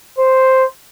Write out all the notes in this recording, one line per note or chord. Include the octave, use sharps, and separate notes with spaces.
C5